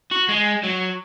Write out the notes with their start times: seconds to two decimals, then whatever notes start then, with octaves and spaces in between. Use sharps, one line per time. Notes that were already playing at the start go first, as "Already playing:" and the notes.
0.11 F#4
0.28 G#3
0.63 F#3